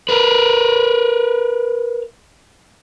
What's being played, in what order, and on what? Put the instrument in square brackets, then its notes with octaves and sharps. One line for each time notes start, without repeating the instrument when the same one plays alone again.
[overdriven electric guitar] A#4 B4